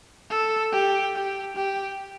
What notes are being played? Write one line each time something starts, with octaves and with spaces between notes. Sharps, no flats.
A4
G4
G4
G4